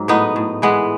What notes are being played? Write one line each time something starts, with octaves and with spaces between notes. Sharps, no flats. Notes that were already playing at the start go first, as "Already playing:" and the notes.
Already playing: G#2 F#3
A2 B3 D#4
A2
E3 G#3 B3